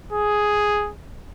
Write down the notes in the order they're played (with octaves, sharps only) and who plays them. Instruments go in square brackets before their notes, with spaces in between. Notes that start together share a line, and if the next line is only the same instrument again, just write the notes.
[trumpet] G#4